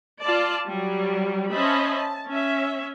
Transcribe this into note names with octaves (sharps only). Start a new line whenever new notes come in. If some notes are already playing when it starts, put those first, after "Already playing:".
F4 D5 A5
F#3 G3
C#4 C5 D#5 E5 A5 B5
A5
C#4 E5